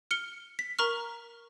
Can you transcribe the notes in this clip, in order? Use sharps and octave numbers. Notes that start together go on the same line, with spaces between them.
F6 C#7 G7
B6
A#4 A#5 C#6 F6